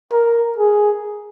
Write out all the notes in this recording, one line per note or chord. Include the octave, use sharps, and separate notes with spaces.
A#4
G#4